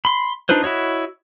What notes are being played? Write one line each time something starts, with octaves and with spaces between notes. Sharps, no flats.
B5 C6
D4 D#4 F4 B4 C5
E4 F#4 C#5 D#5